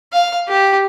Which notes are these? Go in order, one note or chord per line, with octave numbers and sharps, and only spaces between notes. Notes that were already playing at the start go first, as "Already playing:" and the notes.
F5
G4